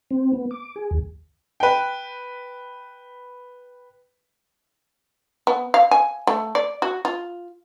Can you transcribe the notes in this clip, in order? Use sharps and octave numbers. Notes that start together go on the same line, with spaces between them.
C4
B3
D6
G#4
D#2
B4 G5
B3
F5
G#5
A3
D5
F#4
F4